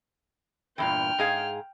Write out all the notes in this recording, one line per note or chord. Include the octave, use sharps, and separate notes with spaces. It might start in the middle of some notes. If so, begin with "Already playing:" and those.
E2 G2 A#2 G5 F6
G#2 G#4 F5